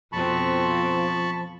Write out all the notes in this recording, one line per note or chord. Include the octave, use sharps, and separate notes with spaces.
F2 B2 F3 C4 A5 B5 C#6